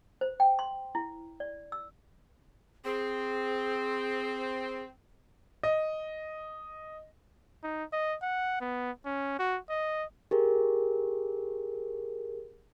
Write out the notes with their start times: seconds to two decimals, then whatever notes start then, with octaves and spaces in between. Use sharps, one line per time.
0.21 C5
0.40 G5
0.59 C6
0.95 E4
1.40 D5
1.72 E6
2.85 C4 G#4
5.63 D#5
7.63 D#4
7.93 D#5
8.22 F#5
8.61 B3
9.05 C#4
9.39 F#4
9.69 D#5
10.31 G4 G#4 A#4